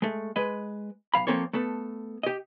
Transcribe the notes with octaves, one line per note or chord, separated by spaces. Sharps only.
G#3 A3
G#3 B4 D#5
B1 F3 F5 B5
F3 G#3 A#3 C4 A4 C#5
A3 B3 A4
G4 D#5